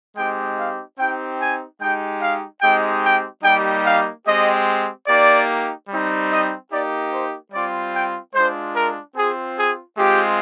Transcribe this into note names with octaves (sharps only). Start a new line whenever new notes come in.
G#3 C4 D#4 G4 G5
F5
C4 D#4 G4 G5
G#5
G#3 D#4 G4 G5
F5
G#3 C4 D#4 G4 G5
G5
G3 A#3 D#4 G4 G5
F5
G#3 C4 G4 D#5
A#3 D#4 G4 D5
G3 C4 D#4
D#5
A#3 D#4 G4 D5
C5
G3 C4 F4 D5
G5
G#3 D4 F4 C5
A#4
C4 F4 G#4
G#4
G#3 C4 F4 G4